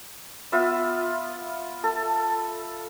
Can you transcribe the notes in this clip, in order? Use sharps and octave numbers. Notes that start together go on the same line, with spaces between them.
B3 F4 E5
A4